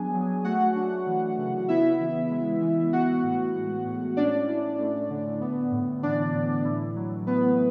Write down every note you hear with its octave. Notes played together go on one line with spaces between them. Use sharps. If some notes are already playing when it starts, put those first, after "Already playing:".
Already playing: F#3 B3 D4 G#4 G#5
F#3
A3 F#4 F#5
D4
E3
C#3
B3 E4 E5
E3
G#3
E3
B3 F#4 F#5
A2
G#3
A2
C#4 D4 D5
E4
A3
D3
B3
A2
E3 D4 D5
A2
E4
F#3
A3 B3 B4